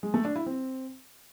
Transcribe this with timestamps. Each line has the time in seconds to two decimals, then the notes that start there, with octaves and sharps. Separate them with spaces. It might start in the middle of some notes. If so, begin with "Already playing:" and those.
0.03 G#3
0.14 A3
0.25 D4
0.35 E4
0.46 C4